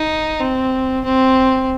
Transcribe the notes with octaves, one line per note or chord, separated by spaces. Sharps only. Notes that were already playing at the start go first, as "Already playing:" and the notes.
Already playing: D#4
C4
C4